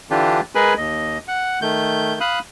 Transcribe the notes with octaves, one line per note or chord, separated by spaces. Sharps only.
D3 E3 D4 F4 G4
G#3 G#4 A#4 B4 G#5 B5
D#2 D#5
F#5
D#3 A3 G6
F5 B5 D#6 F#6